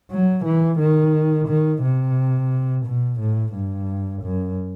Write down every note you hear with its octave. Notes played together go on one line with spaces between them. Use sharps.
F#3
E3
D#3
D#3
C3
B2
A2
G2
F#2